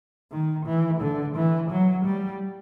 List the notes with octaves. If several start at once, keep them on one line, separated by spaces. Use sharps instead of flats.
D#3
E3
D3
E3
F#3
G3